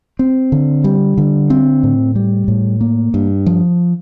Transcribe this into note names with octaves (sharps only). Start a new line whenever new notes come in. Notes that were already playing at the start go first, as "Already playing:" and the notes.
C4
D3
G3
D3
C4
A2
G3
A2
A#3
G2
F3